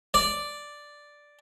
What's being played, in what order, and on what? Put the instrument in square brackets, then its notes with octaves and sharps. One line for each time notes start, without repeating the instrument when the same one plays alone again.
[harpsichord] D5